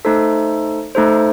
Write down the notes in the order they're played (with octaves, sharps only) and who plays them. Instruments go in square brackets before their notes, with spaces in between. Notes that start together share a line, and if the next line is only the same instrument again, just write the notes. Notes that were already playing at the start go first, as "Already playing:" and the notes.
[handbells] A3 D#4 A4 C5
A3 D#4 A4 C5